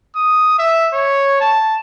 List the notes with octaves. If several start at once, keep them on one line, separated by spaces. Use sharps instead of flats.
D#6
E5
C#5
A5